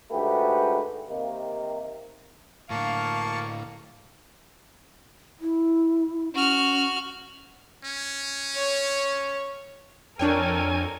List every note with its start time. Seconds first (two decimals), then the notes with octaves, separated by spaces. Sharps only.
0.11 G#2 D3 A3 F#4 G4 B4
1.09 C3 D#3 A#3
2.70 A2 D3 A#3 F5 A5 C#6
5.41 E4
6.34 C#4 F#4 F6
7.84 C#4
8.55 C#5
10.19 F2 D4 A4 A#4 C#5 G5 G#5